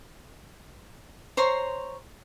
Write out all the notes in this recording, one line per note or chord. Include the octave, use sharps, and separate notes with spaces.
C5 C#5 A#5 C6